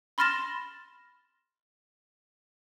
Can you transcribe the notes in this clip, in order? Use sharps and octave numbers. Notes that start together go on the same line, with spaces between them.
B5 C6 F6 A6 A#6 E7